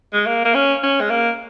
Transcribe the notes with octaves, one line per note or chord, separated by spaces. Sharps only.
G#3
A#3
A#3
C#4
C#4
G#3
A#3